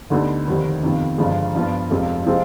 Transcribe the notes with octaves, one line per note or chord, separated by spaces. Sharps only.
D2 D3 G3 B3 D#4
F1 D#2 D#3 G3 C4
F2 C3 D#3 B3 F4
G1 G2 F3 G#3
G2 F3 B3 F4
F1 F2 C3 F3 G#3
C3 F3 G#3 C4